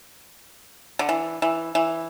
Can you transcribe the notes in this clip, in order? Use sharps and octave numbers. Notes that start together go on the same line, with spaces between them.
D3
E3
E3
E3